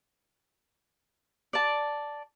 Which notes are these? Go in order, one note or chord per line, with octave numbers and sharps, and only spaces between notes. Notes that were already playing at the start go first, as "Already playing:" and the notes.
D5 A5